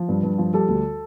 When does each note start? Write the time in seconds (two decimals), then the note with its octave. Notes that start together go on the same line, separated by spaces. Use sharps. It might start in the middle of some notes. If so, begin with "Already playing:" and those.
Already playing: F3
0.09 G2
0.23 G2
0.38 F3
0.54 G3 A4
0.68 D2